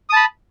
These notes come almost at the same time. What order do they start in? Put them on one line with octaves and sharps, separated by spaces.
D#6 A5 B5